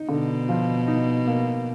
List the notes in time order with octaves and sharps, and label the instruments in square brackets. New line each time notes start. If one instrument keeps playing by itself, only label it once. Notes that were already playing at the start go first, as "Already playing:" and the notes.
Already playing: [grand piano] D#4
[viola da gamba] B2 [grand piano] D3
[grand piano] F3
D#4
A#3